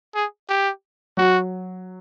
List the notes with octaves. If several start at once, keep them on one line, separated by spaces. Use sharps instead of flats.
G#4
G4
F#3 F#4